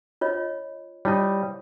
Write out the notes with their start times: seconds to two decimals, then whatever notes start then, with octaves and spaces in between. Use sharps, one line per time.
0.21 F4 C#5 D#5
1.05 G3 E4 F4 C#5 D#5